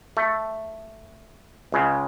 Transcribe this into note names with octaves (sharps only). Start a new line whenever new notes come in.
A3
C#2 C#3 G#3